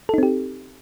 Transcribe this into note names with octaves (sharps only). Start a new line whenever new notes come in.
C4 D#4 G4 A4